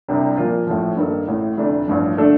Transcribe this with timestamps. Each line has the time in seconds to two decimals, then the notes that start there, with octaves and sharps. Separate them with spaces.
0.08 C2 C3 G3 D4
0.37 A#2 F3 A#3 F4
0.67 A1 A2 F3
0.97 G2 D#3 A#3 D#4 A4
1.28 A1 A2 A3
1.58 F1 F2 D3 A3 D4
1.88 A1 G2 F3
2.18 D3 A3 D4 A4